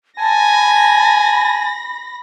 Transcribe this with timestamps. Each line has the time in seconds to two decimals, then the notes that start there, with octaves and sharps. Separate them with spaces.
0.20 G#5 A5 B5 A#6